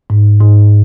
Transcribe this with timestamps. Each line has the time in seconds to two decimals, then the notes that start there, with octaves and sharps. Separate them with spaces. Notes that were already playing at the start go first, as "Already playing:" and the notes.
0.10 G#2
0.41 G#2